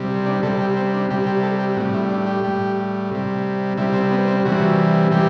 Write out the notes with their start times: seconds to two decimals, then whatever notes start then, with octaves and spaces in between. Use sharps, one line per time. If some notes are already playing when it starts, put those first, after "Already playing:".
Already playing: C3 G3
0.26 D4
0.43 C3 G3 A4
0.61 G4
0.77 C4
0.94 D4
1.10 C3 G3 G4
1.27 G4
1.43 A4
1.60 G4
1.77 A2 G3 F#4
1.94 E4
2.11 D4
2.27 G4
2.43 A2 G3
3.11 C3 G3
3.77 C3 G3 E4
3.94 C4
4.11 B3
4.28 C4
4.45 C3 E3 G3 F#4
5.11 C3 E3 G3 G4